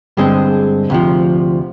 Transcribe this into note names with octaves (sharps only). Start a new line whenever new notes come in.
G2 D3 G#3 C4 G#4
D2 C3 F3